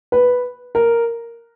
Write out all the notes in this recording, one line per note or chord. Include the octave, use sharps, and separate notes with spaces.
B4
A#4